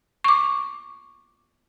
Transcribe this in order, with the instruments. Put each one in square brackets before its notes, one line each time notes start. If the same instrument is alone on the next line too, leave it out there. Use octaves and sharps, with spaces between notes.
[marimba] C#6 D6